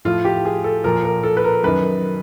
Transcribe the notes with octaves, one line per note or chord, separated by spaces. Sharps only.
A2 F3 F4
G4
G#4
A4
A#2 F3 A#4
A#4
A4
B4
A#4
F#2 D#3 B4